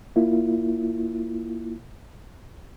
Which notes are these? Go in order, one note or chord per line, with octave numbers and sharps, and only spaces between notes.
A#3 E4 F4